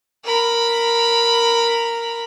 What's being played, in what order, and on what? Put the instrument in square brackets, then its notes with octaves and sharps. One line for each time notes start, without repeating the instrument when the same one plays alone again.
[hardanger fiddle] A#4 B5